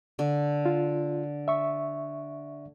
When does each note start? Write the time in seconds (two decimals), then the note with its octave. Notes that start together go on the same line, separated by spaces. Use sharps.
0.19 D3
0.66 F4
1.48 E5 C#6